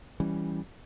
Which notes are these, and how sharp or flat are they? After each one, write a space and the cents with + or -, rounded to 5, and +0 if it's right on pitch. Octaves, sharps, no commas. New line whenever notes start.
E3 +0 G3 +0 C#4 +0